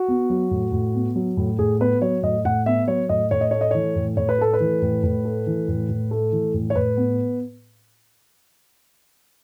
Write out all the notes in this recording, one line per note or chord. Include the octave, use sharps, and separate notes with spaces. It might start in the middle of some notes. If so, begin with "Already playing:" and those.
Already playing: F#4
B3
F#3
A2
A2
B3
F#3
A2
A2 G#4
B3 B4
F#3 C#5
A2 D#5
A2 F#5
B3 E5
F#3 C#5
A2 D#5
A2 C#5
D#5
A3 C#5
D#5
E3 C#5
A2
A2 C#5
B4
A3 A4
B4
E3
A2
A2
A3
E3
A2
A2
A3
E3
A2
C#5
A2 B4
B3